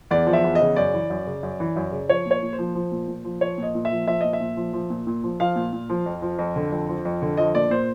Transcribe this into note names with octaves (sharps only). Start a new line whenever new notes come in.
E2 D5
F3
E5
E2
D#5
C#3
F#2 D5
E3
F#2
C#3
F#2
E3
F#2
C#3
F3 C#5
A#2 C#5
A#2
C5
F3
F3
A#2
A#2
F3
F3 C#5
A#2 D#5
A#2
E5
F3
F3 E5
A#2 D#5
E5
A#2
F3
F3
A#2
A#2
F3
F3 F5
A#2
A#2
F3
F2
F3
F2
D3
F2
F3
F2
D3
F3 D#5
A#2 D5
A#2 C5